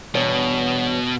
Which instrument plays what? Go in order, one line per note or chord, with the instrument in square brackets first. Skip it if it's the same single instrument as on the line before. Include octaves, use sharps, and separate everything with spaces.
[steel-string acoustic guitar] E2 G2 C#5 [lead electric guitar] B2